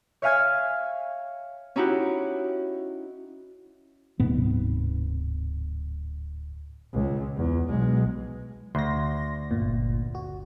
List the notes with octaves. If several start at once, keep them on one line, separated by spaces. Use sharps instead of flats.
C#5 E5 F5 G#5 F6 G#6
C#4 D#4 E4 F#4 G4
D1 G#2 C3 B3
C#2
E2
B1 G#3
D2 C6 A#6
G1 A#2
F#4